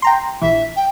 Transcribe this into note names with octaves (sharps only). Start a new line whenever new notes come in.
G5 A#5 C6
A#1 E3 E5
G5